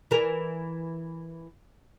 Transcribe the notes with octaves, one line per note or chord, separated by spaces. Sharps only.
E3 A#4